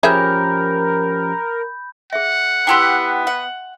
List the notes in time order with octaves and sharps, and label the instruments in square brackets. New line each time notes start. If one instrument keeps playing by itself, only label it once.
[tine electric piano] F3 C#4 G4 [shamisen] G#4 E5 [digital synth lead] A#4 [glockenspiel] B5 G6
[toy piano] G#4 E5 [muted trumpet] F#5
[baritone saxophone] B3 [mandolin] D4 E4 G4 [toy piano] G5 C6
[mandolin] F#5